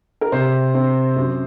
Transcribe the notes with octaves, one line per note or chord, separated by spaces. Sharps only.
A#4
C3 C5
C4
F#2